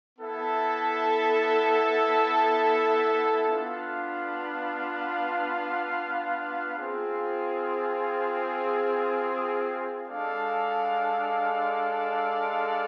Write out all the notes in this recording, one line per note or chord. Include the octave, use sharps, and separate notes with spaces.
B3 E4 A4 E5
B3 D4 F4 B4 F5
C4 F4 G#4
G#3 D4 A4 D5 F5